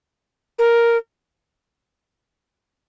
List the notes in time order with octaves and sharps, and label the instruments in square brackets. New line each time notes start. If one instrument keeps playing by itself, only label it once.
[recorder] A#4